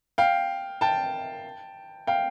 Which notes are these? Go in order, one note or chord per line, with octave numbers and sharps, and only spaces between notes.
F5 G5
G5 A5
F5 G5